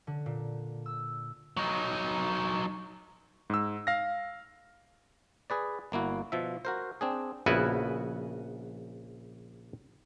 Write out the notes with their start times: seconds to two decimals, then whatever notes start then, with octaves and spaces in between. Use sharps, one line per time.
0.07 D3
0.26 A#2
0.86 E6
1.57 F#3 D#4
3.50 G#2 E6
3.87 F5 A#6
5.50 G#4 B4 D5
5.92 G1 A#3 E4 F#4
6.32 B2 F3 E5
6.65 F#4 A#4 C5
7.01 C4 D4 G#4
7.46 A#1 C#3 B3 E4 F#4 G#5